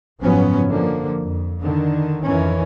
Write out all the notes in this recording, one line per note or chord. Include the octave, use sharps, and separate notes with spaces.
F#1 G#2 F3 F#3 B3 C#4
D3 F3 A#3
F2
D3 D#3
F2 D#3 E3 C#4